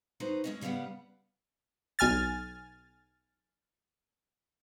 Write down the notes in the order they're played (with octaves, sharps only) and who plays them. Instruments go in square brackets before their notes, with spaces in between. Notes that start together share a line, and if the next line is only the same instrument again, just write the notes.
[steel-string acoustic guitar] D#4 F#4 B4 C5
G#3 C#4 D#5
C#3 G3 B3 F5 F#5
[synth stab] B1 G#5 F6 A6